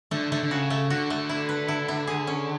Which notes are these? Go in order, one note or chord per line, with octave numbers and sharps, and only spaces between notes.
D3 A3
D3 A3
D3
C#3 F#4
A3
D3 F#4
A3
E4
B4
E4
E4
G#4
C#4